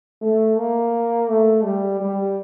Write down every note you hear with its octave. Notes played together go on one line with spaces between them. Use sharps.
A3
A#3
A3
G3
G3